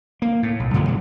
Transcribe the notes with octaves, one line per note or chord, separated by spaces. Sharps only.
A#3
A2
B1
G2 A#2 D3 F3
G#1 A#2 C#3 F#3